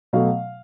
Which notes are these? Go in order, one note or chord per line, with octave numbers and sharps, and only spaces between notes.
B2 F#3 A3 F5